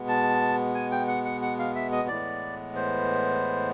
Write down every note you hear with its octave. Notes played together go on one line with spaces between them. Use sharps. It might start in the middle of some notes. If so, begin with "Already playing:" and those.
Already playing: B2 G#3 B3
A5
G#5
G5
F#5
F#5
F#5
F5
E5
D#5
A2 E3 G#3 B3 D5
C5